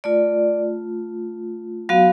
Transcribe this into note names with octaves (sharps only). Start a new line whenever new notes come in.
A3 F4 D5
F#3 B3 F#4 F5